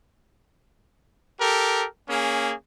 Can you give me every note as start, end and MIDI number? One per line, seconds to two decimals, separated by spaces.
1.40 1.85 67
1.40 1.85 69
1.40 1.85 70
2.09 2.53 58
2.09 2.53 61
2.09 2.53 68